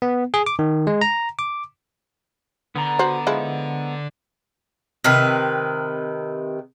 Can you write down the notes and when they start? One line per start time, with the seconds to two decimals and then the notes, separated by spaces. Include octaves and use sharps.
0.02 B3
0.34 G#4
0.46 D6
0.59 D#3
0.87 G#3
1.01 A#5
1.39 D6
2.76 D3 B3 A#5
2.99 F#4 C5
3.27 F3 G#3 E4
5.04 C3 D#3 B4